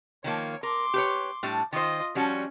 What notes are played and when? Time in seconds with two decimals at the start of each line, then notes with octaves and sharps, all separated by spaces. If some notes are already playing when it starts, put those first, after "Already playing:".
0.24 D#3 F3 A#3 C#5
0.63 A#4 C6 D6
0.94 G4 B4 C#5
1.43 A2 G3 D4
1.73 D#3 F4 C5 D#5
2.15 F3 G3 C#4 F#4